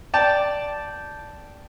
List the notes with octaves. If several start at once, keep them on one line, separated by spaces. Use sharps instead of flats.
D5 G5 A5